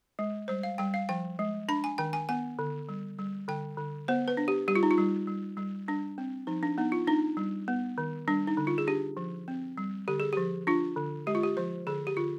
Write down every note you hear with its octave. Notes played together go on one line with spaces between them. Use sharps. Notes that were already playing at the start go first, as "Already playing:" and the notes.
G#3
G3 C5
F5
G3 G5
F5
F3 G5
G#3
D4 B5
G#5
D#3 G5
G#5
B3 G#5
D3
G3
G3
D3 G5
D3
B3 C5
B4
D4
G4
G3 G4
F4
D#4
F4
G3
G3
G3
G3 D4
C4
F3 D#4
D4
B3 D#4
F4
D4 D#4
G3
B3
D#3
G3 D4
D#4
D3
F4
G#4
D4 G4
F3
C4
G3
D3 G4
G#4
F3 G4
D4 F4
D3
G#3 G4
F4
G4
F3 C5
D3 G#4
G4
D3 F4